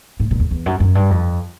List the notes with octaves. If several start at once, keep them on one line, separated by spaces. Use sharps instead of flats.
A2
A#2
E2
E2
F#2
F#2
G2
F2